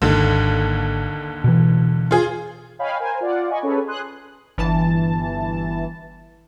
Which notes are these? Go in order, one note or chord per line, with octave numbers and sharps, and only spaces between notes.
G#1 D#2 D3 D#3
B2 E3
F4 G#4
C#5 D#5 F5 G5 G#5 B5
A#4 C5 G#5
F4 D5 F5 F#5
D#5 G#5 B5 C#6
C#4 G#4 A4 B4 C#5
G#5 C6 D#6 F#6
G1 E3 A5